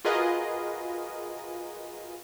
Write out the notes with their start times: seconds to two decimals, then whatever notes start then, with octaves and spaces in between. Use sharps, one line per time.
0.05 F4 F#4 G#4 A#4 B4 D#5